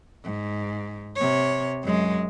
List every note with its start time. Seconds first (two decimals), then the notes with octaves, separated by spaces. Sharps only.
0.24 G#2
1.15 C3 C#5
1.83 F#2 G#3